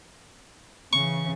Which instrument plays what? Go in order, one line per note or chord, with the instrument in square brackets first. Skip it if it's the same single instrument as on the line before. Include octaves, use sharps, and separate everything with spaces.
[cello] C#3 E3 [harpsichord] C#6